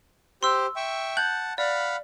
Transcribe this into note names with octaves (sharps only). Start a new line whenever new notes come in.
G4 C5 C6 E6
E5 G5 C#6
F#5 A5 F#6 G6 F#7
D5 F5 F#5 B5